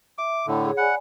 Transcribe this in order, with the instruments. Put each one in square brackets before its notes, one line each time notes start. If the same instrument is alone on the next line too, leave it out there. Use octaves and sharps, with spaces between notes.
[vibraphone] E5 [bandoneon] D6
[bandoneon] A2 D3
[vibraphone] G#4 C#5
[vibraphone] D5 G#5 B5 [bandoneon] F#5